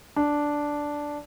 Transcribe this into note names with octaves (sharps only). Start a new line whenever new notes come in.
D4